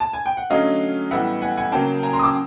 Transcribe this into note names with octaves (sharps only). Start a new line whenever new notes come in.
A5
G#5
G5
F#5
D3 F#3 A3 C#4 D#5 F5
A2 E3 G3 B3 E5 F#5
F#5 G#5
F#5 G#5
C#3 F#3 A#3 C#4 G5 A5
G#5 A#5
A#5 C6
D#6
D6 E6